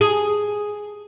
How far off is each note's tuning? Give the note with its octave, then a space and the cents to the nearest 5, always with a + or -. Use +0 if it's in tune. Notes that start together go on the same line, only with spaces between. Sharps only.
G#4 +0